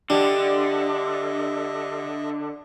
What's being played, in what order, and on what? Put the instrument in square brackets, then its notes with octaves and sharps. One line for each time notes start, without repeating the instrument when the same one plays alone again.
[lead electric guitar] D3 [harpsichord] G3 [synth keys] D4 [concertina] D#5 E5